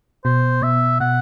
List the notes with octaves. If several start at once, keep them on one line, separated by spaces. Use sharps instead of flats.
B2 C5
B2 E5
B2 F#5